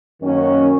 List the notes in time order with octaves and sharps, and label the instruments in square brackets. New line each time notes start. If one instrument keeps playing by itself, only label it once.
[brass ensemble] F#2 D#3 A#3 C#4 F#4